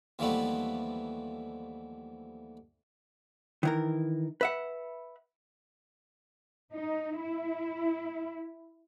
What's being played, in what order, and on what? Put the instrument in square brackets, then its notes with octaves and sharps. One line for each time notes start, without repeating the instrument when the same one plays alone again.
[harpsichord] D#2 E3 F3 G3 A3 B3
[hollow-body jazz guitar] D#3 E3 A#4
B4 E5 F#5
[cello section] D#4
E4